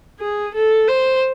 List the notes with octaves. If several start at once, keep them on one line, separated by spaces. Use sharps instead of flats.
G#4
A4
C5